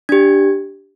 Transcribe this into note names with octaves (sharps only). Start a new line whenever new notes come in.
D4 G4 G#6